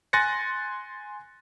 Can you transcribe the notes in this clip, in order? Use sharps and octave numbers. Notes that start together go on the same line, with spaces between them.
G#5 C6 F#6 A6 A#6 C#7